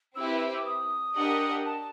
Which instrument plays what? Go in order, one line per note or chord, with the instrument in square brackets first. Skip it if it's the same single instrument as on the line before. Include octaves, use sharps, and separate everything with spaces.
[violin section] C4 E4 G4 B4 [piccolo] E6
[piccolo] D6
D#6
[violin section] D4 G4 A#4 D#5 F#5
[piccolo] A5